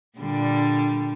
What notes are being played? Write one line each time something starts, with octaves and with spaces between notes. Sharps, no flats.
A#2 D3 G3